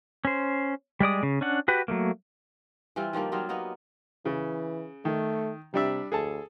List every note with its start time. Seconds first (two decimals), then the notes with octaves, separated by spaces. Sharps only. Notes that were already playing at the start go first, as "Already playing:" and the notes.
0.25 C#4 C5
1.00 G3 G#3 D5 D#6
1.23 C#3
1.41 C#4 D4 F#5
1.68 F#4 G4 B4
1.88 F#3 A3 A#3
2.96 E3 G3 C4 F4
3.13 D#3 F3 G3 A#3
3.32 F#3 G3 D#4 F4
3.49 A#3 B3 D#4
4.25 C#3 E3
5.05 D#3 A3
5.74 C3 G3 D4 E5
6.12 D2 G#4 A4 A5